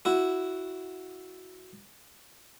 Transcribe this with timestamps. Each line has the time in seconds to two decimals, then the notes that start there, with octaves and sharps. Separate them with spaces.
0.05 E4 F#4